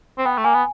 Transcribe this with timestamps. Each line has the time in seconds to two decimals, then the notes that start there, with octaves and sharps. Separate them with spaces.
0.18 C4
0.26 B3 G5
0.37 A3
0.44 A#3 G#5
0.54 B3